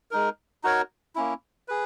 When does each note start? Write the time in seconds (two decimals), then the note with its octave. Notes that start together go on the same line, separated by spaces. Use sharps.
0.11 G#3 D#4 A#4
0.64 D#4 F#4 A#4 C#5
1.15 A#3 C#4 E4
1.68 G#4 B4